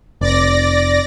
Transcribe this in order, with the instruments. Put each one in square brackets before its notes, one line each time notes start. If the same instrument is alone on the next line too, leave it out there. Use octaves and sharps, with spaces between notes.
[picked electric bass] F1 [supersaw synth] D5 A#6